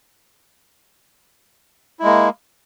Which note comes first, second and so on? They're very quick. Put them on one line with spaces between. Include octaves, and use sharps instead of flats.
E4 G#3 A#3